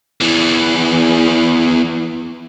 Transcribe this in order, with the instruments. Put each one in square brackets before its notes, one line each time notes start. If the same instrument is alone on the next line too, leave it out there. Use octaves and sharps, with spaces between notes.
[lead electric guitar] E2 E3